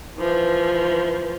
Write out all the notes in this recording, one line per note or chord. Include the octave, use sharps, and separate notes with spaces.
E3 F3